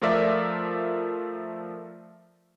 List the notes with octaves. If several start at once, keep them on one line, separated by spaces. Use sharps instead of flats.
F3 A3 F4 A#4 D5 E5